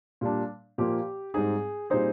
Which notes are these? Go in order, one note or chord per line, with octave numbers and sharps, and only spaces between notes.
A#2 G3 D4
A#2 F3 A#3 G4
G#2 G3 C4 D#4 G#4
A#2 G3 C4 D#4 G#4 C5